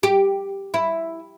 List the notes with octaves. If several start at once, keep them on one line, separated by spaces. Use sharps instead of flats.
G4
E4